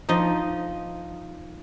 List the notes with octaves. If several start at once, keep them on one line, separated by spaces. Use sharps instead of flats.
F3 D#4 D#5